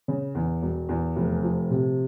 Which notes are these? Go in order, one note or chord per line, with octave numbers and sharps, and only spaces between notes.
C#3
E2
E1
E2
F1
F3
C3